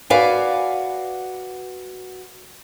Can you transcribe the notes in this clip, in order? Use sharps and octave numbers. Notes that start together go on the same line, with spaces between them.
F#4 B4 D5 F5 G#5